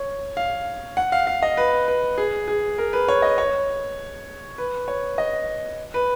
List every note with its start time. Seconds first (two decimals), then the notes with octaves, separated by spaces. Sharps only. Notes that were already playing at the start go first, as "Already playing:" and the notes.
Already playing: C#5
0.37 F5
0.97 F#5
1.12 F5
1.27 F5
1.42 D#5
1.57 B4
1.88 B4
2.18 G#4
2.48 G#4
2.78 A#4
2.93 B4
3.08 C#5
3.22 D#5
3.38 C#5
4.58 B4
4.88 C#5
5.18 D#5
5.94 B4